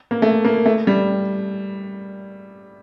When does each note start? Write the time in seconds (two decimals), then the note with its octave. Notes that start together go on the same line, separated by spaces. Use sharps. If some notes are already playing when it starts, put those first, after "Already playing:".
0.11 A#3
0.22 A3
0.45 A#3
0.66 A3
0.87 G3